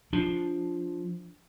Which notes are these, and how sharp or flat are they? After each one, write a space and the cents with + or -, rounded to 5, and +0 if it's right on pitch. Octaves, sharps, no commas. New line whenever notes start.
F3 +0 D4 -5